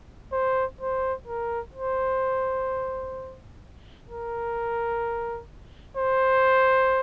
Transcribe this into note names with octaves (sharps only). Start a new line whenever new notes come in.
C5
C5
A#4
C5
A#4
C5